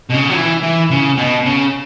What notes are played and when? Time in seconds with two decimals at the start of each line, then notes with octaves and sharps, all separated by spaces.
0.09 B2
0.14 C#3
0.30 F#3
0.34 E3
0.63 E3
0.91 C#3
1.17 B2
1.46 C#3